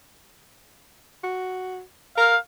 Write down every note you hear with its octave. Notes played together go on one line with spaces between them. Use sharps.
F#4
A#4 F5